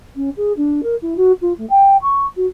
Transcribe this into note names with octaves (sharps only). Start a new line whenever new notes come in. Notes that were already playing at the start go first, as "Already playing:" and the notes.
C#4
G#4
D4
A#4
E4
F#4
F4
A3
G5
C#6
F#4